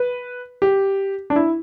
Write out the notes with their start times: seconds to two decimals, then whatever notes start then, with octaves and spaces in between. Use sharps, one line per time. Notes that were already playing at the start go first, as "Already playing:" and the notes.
Already playing: B4
0.62 G4
1.30 D4
1.36 E4